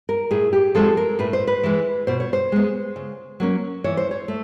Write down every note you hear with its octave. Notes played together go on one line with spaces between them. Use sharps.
A#4
A2 G#4
G4
F3 G#3 C4 A4
A#4
A2 B4
C5
B4
E3 G#3
B2 C5
C#5
C5
G#3 B3
C#3
F#3 A#3 C#4
E3 C#5
C5
C#5
A3